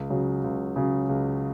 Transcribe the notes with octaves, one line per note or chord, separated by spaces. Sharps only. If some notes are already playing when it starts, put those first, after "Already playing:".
Already playing: C#2
C#3 F#3
C#2
C#3 F#3
C#2